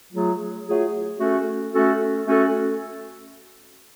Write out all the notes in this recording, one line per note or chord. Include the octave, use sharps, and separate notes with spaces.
F#3 A3 F4 G#4
F#3 A3 F4 G#4
A3 C#4 F#4 A4
A3 C#4 F#4 A4
A3 C#4 F#4 A4